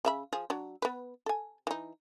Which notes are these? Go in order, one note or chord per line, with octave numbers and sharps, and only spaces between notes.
C#3 E5 B5
F3 G#4
F#3 D4
B3 B4
A4 G#5
E3 D#4